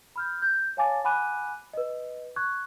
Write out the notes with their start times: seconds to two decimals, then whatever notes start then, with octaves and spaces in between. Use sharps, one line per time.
0.16 B5 F6 G6
0.42 G6
0.77 C#5 F5 G#5 A5 D6 A6
1.04 F#5 G#5 B5 D6 F#6 D#7
1.73 B4 D#5
2.36 C#6 F#6 G#6